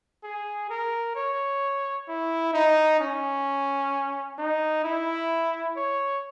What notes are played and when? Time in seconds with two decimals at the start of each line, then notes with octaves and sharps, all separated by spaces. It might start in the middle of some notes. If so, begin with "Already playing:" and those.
0.23 G#4
0.70 A#4
1.15 C#5
2.08 E4
2.54 D#4
3.00 C#4
4.38 D#4
4.84 E4
5.77 C#5